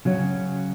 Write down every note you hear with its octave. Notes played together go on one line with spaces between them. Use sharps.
C#3 F#3 C#4